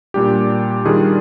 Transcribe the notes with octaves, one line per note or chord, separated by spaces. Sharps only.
A#2 G3 D4 G4
D#3 G3 D4 F4 G#4